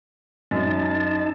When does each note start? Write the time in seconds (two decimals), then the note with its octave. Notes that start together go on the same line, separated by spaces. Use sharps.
0.51 F#2 D#4 A5